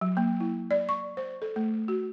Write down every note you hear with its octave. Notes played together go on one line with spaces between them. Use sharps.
F#3
A#3
E4
D5
C#6
C5
A4
A3
F#4